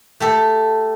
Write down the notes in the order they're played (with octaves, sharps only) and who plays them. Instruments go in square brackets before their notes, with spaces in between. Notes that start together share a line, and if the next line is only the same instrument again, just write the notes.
[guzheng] A3 G4 A4